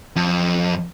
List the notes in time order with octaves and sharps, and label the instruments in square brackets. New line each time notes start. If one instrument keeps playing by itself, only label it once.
[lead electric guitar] F2